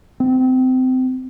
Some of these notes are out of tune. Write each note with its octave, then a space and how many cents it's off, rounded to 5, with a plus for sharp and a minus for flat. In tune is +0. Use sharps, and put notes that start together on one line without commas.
C4 -25